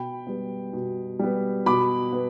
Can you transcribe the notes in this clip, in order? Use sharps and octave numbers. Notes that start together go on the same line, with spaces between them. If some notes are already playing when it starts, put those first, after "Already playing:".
Already playing: B2 G5 B5
G3 B3
B2
G3 B3
B2 B5 D6
B3